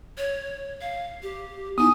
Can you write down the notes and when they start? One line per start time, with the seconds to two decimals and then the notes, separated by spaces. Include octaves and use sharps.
0.17 C#5
0.81 F5
1.23 G4
1.78 B3 D#4 E4 G#5 D#6